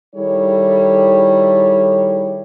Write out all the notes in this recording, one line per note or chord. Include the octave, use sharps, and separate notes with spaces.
D#3 G3 E4 G#4 A4 C#5